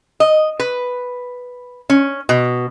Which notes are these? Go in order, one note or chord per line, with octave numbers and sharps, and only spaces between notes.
D#5
B4
C#4
B2